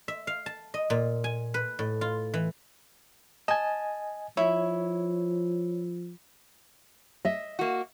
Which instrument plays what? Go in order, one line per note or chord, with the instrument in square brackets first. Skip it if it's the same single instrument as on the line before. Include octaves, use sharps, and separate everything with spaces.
[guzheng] E5
F5
A5
D#5
A#2
G#5
B4
A2
F4
E3
[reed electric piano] D#5 G#5 [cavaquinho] A5
[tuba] F3 [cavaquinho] E4 [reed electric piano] C#5
[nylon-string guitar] D#5 E5
[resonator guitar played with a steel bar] A#3 F#4